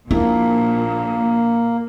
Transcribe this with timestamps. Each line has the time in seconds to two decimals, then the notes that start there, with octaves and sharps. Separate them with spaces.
0.11 A#1 A#2 A#3 E4